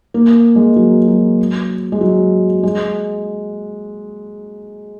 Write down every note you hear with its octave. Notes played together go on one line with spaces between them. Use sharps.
A#3
G#3
F#3
F#3
G#3
F#3
G#3